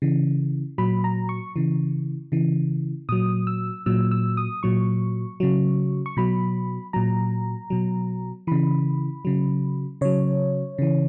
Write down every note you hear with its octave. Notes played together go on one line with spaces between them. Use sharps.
C#3 E3
A#2 F#3 B5
A#5
C#6
C#3 E3
C#3 E3
A#2 F#3 D#6
E6
A#2 F#3 E6
E6
D#6
A#2 F#3 C#6
C#3 F#3
C#6
B2 F#3 B5
A#2 F#3 A#5
B2 F#3
C#3 E3 B5
C#3 F#3
C#3 F#3 C#5
C#3 E3